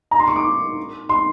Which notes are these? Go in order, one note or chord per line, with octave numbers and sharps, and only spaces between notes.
A#5
C6
C#6
D6
C6